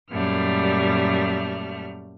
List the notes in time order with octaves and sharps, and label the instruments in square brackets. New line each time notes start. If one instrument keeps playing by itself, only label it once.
[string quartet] F#2 A#2 G3 A3 F6